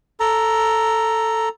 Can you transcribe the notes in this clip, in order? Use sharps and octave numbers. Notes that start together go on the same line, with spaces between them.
A4 A#5